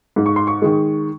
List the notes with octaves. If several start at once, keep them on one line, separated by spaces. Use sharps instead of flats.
G#2
C#6
C6
C#6
D#3 G#3